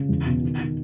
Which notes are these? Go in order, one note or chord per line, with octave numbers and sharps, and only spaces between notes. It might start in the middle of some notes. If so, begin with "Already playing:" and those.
Already playing: C#3
E2
B2
D#3
D#3